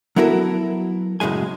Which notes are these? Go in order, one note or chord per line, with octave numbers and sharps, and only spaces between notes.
F#3 B3 E4 A4 A#4
F#2 A2 C#3 G#3 G#5